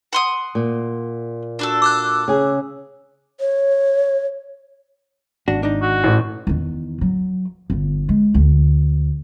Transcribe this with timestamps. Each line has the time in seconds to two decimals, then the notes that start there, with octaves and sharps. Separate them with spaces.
0.13 F#5 C6 D#6
0.55 A#2
1.59 D4 F#4 A4
1.82 D6 E6 F#6
2.28 C#3 G#4
3.40 C#5
5.48 G#1 D4 F#4
5.63 D4 D#4
5.82 F#4
6.04 A1
6.47 E2 D#3
7.01 F#3
7.70 G1 D3
8.09 G#3
8.34 D2